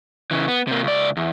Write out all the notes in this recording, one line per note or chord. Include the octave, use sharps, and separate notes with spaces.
C#3 E3
B3
C3 A#3
C#2 D5
E2